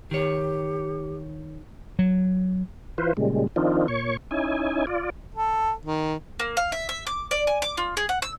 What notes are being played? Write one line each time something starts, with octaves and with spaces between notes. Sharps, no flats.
D#3 G4 C#5
F#3
E3 F4 B4 C5
A#2 C#3 G3 G#3
D#3 F3 C4 D4 D#4 F4
A#2 C#5 C#6
C#4 D#4 E4 G#5
F4 D5
A4
D#3
A#3
F5
E5
E5
D6
D5
G#5
D6
F4
G#4
F#5
E6